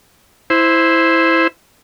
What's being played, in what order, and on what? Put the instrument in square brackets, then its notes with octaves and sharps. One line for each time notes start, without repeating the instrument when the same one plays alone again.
[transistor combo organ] E4 C5